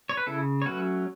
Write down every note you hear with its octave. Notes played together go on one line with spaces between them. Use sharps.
C#5
B4
C#3 E4 A4
C#5
F#3 A3 C#4 F#4 B4